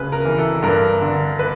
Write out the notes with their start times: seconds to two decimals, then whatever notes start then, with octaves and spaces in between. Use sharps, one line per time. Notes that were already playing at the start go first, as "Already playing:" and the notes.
Already playing: D2 C#3 B4
0.12 A#4
0.25 E3
0.38 A4
0.62 G2 A#4
1.01 D3
1.39 B4